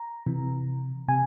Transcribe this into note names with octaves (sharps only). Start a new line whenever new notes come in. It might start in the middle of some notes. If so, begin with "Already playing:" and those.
Already playing: A#5
C3 E3
C3 G#5